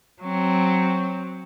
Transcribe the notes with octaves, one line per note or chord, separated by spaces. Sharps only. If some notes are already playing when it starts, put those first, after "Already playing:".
F#3 C4